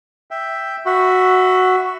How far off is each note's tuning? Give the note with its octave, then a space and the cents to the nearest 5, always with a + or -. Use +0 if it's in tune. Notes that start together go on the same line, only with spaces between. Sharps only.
E5 +0 G5 +5
F#4 +0 E5 +0 B5 +35